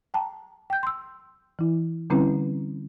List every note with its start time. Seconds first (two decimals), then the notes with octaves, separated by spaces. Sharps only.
0.14 G5 A5 A#5
0.70 G5 G6
0.83 C6 E6
1.59 E3 E4
2.10 D3 G3 C4 C#4 E4 B4